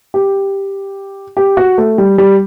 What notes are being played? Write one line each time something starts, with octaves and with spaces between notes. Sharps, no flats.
G4
G4
F#4
A3
G3
G3